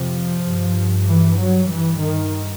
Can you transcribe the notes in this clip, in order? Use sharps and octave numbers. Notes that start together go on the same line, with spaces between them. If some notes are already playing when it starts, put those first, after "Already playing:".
Already playing: F2 C3 F3
G2
E3
F#3
G2 E3
D#3